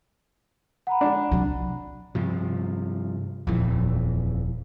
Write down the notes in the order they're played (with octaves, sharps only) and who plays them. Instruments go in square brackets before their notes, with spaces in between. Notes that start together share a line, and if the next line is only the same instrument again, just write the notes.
[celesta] F#5 A#5 B5
[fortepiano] D4
[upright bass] C3 F#3
[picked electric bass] G2 C3 F3
[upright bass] D#1 F3 [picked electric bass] F2 E3